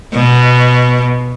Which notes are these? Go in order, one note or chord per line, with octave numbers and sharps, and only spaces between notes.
B2